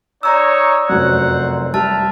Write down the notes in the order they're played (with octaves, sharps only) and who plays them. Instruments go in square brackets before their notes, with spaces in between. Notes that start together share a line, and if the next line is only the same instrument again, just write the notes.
[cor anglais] D#4 [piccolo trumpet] C#5 [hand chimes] D5 A#5 E6
[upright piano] F1 F#2 [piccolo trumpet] C5 [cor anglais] F#5
[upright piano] G3 [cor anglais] E5 [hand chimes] A5 [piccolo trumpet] F6